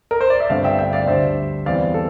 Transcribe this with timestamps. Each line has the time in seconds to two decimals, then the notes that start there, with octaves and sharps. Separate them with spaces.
0.11 A#4
0.21 C5
0.30 D5
0.40 E5
0.50 G1 G2 D3 A3 C4 D5 F5
0.64 E5 G5
0.78 E5 G5
0.93 D5 F5
1.07 D2 D3 G3 C5 E5
1.66 E2 E3 G3 C4 D5 F5
1.94 A4